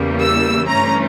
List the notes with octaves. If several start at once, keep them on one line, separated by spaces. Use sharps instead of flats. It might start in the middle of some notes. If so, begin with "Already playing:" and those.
Already playing: E2 C#3 E3 G3 A#3
E6
G2 E3 A3 C#4 A#5